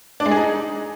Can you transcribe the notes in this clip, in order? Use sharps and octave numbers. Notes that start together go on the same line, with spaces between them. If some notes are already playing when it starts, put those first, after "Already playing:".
D4
G#3
G#4
D#4